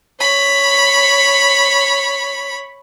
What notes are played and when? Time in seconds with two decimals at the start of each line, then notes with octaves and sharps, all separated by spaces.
0.20 C#5 B5